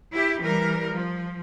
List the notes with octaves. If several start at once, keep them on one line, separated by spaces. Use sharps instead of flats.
E4 G4
E3 G3 A#4
F3